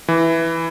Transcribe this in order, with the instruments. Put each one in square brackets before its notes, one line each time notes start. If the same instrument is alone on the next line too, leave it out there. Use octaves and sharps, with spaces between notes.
[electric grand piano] E3